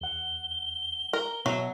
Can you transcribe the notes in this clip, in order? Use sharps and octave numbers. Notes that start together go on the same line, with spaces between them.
E2 F#5 G7
A#4
B2 F#3 E5